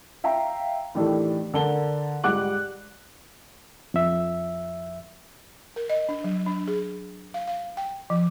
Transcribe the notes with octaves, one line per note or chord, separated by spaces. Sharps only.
E5 F5 G5 A#5
A2 D#3 E3 D4 G4 A4
D3 A#4 A5 G7
G#2 G3 F#5 D6 F#6
F2 E5
A#4
D#5
D4
F#3
D4
G#4
F5
F5
G5
F3